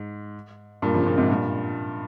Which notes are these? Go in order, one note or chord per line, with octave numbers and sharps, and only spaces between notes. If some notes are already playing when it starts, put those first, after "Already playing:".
Already playing: G#2
G2 A#2
C#3 F3
A#2 C#3
G#2 C3
G2 A#2